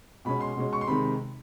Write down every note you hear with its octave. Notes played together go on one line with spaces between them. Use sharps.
B2 G#3 C#4 B5
C6
B2 G#3 C#4
C#6
C6
C3 D#3 G#3 B5